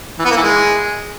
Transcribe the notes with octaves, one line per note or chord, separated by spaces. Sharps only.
E3
B3
A#3
E3
G#3